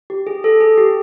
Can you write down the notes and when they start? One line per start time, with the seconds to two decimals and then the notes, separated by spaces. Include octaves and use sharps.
0.10 G4
0.27 G#4
0.44 A4
0.60 G#4
0.78 G4